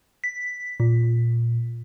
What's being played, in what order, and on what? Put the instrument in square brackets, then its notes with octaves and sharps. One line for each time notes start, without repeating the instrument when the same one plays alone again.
[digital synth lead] B6
A#2